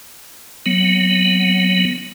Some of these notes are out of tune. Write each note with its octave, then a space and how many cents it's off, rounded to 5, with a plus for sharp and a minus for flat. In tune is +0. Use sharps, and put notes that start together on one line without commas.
F#3 +0 B3 +0